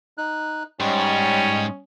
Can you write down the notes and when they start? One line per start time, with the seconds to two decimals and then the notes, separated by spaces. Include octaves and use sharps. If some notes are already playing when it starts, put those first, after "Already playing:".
0.18 D#4 F#6
0.80 G#2 G3 C#4 C#5 D#5